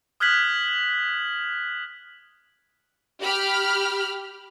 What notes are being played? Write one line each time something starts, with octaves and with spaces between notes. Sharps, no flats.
D#6 F6 F#6 G#6 B6 F#7
G4 B5 F6